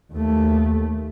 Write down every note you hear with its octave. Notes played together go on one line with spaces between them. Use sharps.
D#2 A3